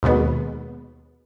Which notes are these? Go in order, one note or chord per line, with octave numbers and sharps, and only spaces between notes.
D#2 B2 G#3 B3